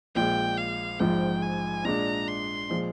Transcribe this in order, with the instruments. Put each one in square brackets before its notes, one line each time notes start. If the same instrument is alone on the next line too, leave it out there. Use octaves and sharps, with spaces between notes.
[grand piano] A#1 A#2 G#3 [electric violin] G5
[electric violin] F5
[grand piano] A#1 G#2 F3 [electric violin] G5
[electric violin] G#5
[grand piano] A#2 G#3 D4 [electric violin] A#5
[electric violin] C6
[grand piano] A#2 F3 G#3